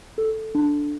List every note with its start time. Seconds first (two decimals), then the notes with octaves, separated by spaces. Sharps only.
0.18 A4
0.55 D4